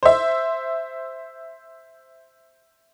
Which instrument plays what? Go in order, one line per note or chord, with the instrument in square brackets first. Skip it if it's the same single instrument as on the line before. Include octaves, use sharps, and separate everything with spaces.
[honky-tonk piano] C5 E5